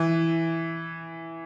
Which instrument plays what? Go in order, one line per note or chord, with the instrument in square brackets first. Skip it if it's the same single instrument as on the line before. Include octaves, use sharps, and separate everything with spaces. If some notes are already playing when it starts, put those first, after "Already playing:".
Already playing: [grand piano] E3